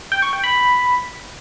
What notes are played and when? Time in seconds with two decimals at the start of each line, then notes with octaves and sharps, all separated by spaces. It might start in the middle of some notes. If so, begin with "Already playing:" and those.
0.12 G5
0.22 C#6
0.33 G5
0.44 B5